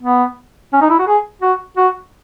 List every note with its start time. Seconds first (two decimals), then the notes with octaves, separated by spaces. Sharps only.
0.03 B3
0.73 C#4
0.81 D#4
0.90 E4
0.99 F#4
1.07 G#4
1.42 F#4
1.77 F#4